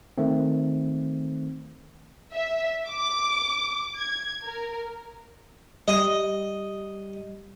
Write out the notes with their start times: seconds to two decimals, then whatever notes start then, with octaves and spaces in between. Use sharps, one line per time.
0.18 D#3 A3 C4
2.32 E5
2.89 D6
3.99 G#6
4.45 A#4
5.88 G3 D#5